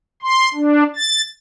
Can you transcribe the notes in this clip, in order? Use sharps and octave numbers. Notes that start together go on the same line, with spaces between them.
C6
D4
A6